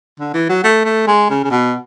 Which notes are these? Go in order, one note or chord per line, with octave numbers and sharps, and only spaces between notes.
D3
E3
F#3
A3
A3
G#3
C#3
C#3
B2